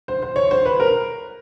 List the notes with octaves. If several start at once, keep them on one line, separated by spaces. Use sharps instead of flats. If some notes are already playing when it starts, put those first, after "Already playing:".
C5
C5
C#5
C5
B4
A#4